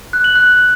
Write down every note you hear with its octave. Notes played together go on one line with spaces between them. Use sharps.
F#6
F#7
F#6